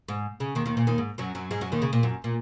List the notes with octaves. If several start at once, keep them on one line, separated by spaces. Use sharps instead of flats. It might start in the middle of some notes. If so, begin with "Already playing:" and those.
G#2
C#3
D#2 D#3
D#2 D#3
A#2
D#2 D#3
G#2
F#2 F#3
F#2 F#3
G#2 G#3
F#2 F#3
D#2 D#3
C#3
A#2
F#2
A#2